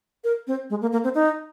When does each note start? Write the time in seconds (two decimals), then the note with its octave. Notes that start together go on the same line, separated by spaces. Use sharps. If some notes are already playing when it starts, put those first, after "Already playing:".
0.24 A#4
0.47 C4
0.70 G#3
0.81 A#3
0.92 A#3
1.04 C4
1.15 D#4